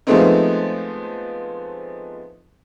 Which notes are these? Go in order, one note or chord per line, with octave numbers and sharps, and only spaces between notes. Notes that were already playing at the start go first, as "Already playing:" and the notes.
F3 G#3 A3 B3 C4 D#4